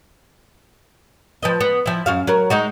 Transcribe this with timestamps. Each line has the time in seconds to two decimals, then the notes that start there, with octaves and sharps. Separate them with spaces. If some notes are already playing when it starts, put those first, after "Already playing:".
1.43 F3 B4 D#5
1.61 B3
1.86 F3 E4
2.06 F#2 F#4 F5
2.27 F#3 A#4
2.50 G#3 D#4 F#4